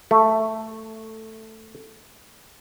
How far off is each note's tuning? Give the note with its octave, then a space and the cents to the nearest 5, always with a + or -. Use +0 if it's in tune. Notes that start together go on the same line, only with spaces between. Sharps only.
A3 +5